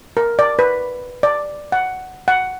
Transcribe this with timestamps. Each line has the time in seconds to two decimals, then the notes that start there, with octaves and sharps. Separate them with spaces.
0.17 A#4
0.39 D5
0.59 B4
1.23 D5
1.72 F#5
2.28 F#5